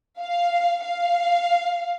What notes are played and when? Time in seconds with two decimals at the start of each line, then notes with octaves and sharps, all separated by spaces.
0.20 F5
0.85 F5